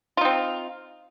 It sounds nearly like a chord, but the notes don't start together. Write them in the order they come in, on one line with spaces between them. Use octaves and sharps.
F4 D#4 C4